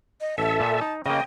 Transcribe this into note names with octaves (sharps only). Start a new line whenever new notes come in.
D#5
A1 A4 E5 A5
A#2
D#4
C#3 A#3 D#5 G5